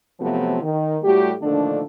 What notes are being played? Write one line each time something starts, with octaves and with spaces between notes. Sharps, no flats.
C3 F3 F#3 A3 B3 F4
D#3
A2 G3 A3 F#4 G4
A#2 D3 D#3 F3 A3 D4